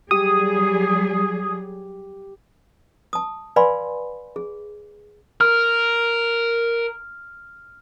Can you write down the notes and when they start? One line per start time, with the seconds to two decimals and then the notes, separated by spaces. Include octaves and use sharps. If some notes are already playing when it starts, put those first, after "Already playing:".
0.11 F#3 G3 G4 G#4 D#6
3.13 A5 D#6
3.56 B4 D5 F5 G#5 B5 C6
4.36 G#4
5.41 A#4 F6